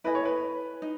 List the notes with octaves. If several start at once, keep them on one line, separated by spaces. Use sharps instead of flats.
E4 A4 B4 D#5 G#5
C#5
B4
D#4